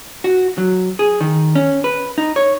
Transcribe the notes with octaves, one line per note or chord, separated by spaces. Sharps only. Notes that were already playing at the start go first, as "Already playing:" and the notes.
F#4
F#3
G#4
D#3
C#4
B4
D#4
C#5